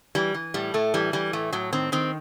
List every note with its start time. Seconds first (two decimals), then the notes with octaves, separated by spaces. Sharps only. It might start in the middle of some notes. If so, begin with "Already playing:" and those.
0.15 E3 G3
0.34 E3
0.54 A2 G3
0.74 A2 A3
0.94 E3 G3
1.13 E3 G3
1.33 A2 A3
1.53 A2 F#3
1.73 D#3 C4
1.92 D#3 C4